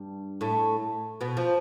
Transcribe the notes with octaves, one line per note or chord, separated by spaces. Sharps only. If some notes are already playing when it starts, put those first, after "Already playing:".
Already playing: G2 G3
A2 A3
B2 B3
F3